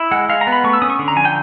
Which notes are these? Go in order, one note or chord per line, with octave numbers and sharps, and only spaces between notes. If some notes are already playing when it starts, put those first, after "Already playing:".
Already playing: E4
G#3 F#5
G#3 F5
A#5
B3
B5
A3 C#6
E6
C#4 D#6
C#6
D3
A#5
F3 G#5
G5